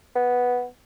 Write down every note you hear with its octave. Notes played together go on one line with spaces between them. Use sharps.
B3